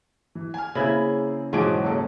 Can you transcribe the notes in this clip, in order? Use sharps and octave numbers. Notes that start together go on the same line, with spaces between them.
E3
G#5 F6
C#3 A#3 C4 E4 G#4
B1 G#2 E3 F3 C#4 D7
F#1 G#4 A4